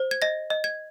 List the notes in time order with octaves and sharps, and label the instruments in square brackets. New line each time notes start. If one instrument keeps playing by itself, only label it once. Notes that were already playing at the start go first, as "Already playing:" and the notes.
Already playing: [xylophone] C5
G#6
D#5 A#6
D#5
G#6